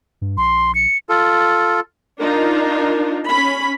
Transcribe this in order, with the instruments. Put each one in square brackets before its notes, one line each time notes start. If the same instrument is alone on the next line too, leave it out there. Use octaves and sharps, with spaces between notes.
[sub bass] G2
[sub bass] A#1 [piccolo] C6
[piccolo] C#7
[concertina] F4 A4
[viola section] D4 D#4 F4 A#4
C#4 B5